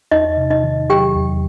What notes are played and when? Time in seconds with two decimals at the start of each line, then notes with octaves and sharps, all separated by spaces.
0.11 E2 D#4 D#5
0.37 C3
0.50 D#4 D#5
0.64 D#3
0.90 F#3 G4 G5
1.15 E2